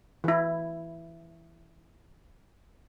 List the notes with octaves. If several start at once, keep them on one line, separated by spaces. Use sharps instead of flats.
E3 E4